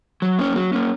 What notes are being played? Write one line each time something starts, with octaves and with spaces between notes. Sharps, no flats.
F#3
A#3 C#4
F#3
A#3 C#4